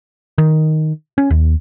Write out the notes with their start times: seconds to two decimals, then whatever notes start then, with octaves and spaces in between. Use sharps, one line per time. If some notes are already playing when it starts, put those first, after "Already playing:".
0.38 D#3
1.18 C#4
1.30 D#2